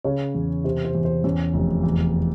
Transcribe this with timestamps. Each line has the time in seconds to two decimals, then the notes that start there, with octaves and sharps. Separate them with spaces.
0.04 C#3 C#5
0.35 E2
0.64 C3 C5
0.85 C5
0.95 E2
1.05 C5
1.24 E2 C#4
1.54 F1
1.84 E2